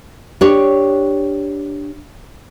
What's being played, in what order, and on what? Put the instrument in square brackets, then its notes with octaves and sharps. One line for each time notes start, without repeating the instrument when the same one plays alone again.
[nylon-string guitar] D4 G4 C#5